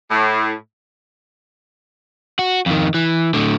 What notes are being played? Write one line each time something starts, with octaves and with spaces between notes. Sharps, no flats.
A2
F#4
F2 D#3
E3
A2 D3